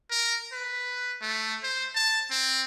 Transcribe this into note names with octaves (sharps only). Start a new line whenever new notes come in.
A#4
B4
A3
C5
A5
C4